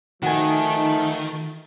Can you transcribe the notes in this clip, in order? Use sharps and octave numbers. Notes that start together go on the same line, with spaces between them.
D#3 F3 A3 D#4 F#4 G#5